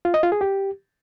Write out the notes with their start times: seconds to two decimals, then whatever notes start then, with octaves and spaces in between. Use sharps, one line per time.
0.05 F4
0.14 D#5
0.23 F4
0.32 G#4
0.41 G4